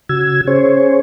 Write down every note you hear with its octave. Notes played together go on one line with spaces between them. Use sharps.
C#3 F#4 E6 G#6
C#4 G#4 C5 C#5